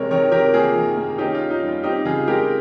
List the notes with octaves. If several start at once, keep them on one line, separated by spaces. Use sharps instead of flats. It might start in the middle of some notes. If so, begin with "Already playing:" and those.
Already playing: C3 G#3 A#4 C#5
D#3 A#4 C#5
C3 G4 A#4
A#3 F4 G#4
D#3
A#3
C#4 D#4 G4
F4
C#4
D#4
G3
F4
C4 D#4 G4
C#3 F4 G#4
G#3 G4 A#4